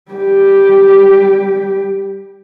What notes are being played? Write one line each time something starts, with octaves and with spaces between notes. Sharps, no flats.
G3 G4